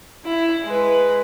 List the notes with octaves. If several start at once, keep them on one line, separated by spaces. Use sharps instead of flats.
E4
G#3 B4